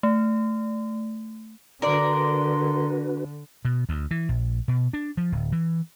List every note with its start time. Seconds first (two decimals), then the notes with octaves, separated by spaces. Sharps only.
0.03 A3
1.82 D3 D4 F#4 A#4 B4 D5 C6
3.65 B2
3.89 D2
4.11 E3
4.29 A#1
4.68 B2
4.93 D4
5.17 F3
5.32 D1
5.52 E3